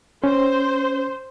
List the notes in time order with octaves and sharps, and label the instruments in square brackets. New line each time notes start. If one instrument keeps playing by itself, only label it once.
[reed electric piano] C#4 [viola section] C5